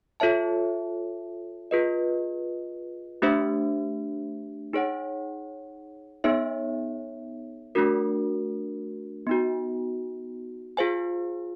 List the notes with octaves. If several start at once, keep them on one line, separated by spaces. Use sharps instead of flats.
F4 A4 C#5 E5 A5
F4 G#4 B4 D#5
A3 D4 G4 C5 E5
D#4 G#4 C#5 F#5
B3 D#4 G#4 C#5 E5
A3 D4 F#4 A#4
B3 D#4 F#4
F4 G#4 C5 F5 G#5